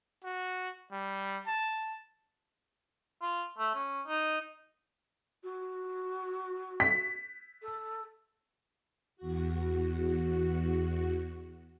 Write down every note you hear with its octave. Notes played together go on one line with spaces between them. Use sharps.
F#4
G3
A5
F4
A3
C#4
D#4
F#4
B6
A4
E2 F#4